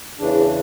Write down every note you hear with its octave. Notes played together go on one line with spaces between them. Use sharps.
E2 C#3 E3 D4